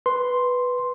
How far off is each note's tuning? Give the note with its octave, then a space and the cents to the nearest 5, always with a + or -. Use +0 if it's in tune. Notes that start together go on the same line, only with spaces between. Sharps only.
B4 +0 C6 +0